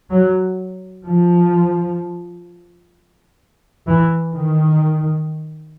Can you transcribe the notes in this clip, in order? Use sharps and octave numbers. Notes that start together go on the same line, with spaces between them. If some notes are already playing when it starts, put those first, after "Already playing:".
F#3
F3
E3
D#3